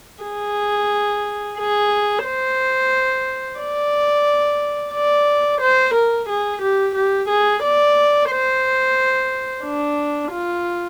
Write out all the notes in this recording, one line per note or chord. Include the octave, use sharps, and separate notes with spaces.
G#4
G#4
C5
D5
D5
C5
A#4
G#4
G4
G4
G#4
D5
C5
D4
F4